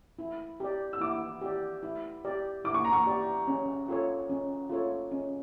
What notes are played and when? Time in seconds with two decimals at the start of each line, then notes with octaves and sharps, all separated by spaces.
0.19 E4
0.60 G4 D5
0.93 E6
1.01 E4 D6
1.41 G4 D5
1.83 E4
2.25 G4 D5
2.64 E4 D6
2.74 C#6
2.85 A#5
2.93 C#6
3.06 G4 D5
3.48 C#4
3.88 F4 A4 C#5
4.29 C#4
4.70 F4 A4 C#5
5.11 C#4